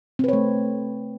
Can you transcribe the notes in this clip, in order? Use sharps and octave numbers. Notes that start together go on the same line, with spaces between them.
A3 C4 B4 C#5